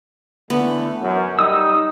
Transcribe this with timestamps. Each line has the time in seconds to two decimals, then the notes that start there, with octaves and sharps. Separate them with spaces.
0.50 D3 E3 A3 B3
1.01 F#2
1.39 G3 D#4 D#6 E6